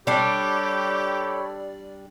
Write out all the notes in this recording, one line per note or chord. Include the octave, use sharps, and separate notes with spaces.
G3 D4 G4 A4 C#5 D5 B5